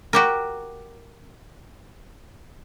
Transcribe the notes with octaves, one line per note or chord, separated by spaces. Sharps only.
F#4 G4 A#4